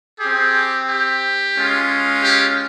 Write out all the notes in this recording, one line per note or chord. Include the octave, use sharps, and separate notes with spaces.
C4 G4 G#4
G4
G#3 C#4 F4
G4